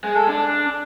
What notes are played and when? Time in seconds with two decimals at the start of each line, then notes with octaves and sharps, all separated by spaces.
0.04 G#3
0.16 A4
0.27 D4